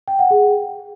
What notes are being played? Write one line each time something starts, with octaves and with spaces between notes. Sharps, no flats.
G5
F#5
G#4